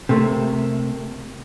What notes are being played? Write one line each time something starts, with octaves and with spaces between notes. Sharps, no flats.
C3 A3 A#3